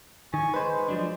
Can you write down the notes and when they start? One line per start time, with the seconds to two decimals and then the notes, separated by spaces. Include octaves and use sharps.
0.34 D#3 G#5 C#6
0.54 G#3 B4 C5
0.88 F3 F#3 D4